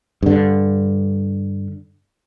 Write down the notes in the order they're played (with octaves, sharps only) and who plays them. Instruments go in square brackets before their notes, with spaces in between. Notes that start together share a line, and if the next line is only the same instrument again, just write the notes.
[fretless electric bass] G2 D3